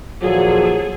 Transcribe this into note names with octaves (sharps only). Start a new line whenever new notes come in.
D#2 A#2 F3 F#3 G#4 A4